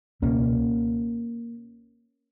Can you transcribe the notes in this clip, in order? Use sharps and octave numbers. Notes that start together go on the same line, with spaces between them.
C#2 B2 A#3 C#4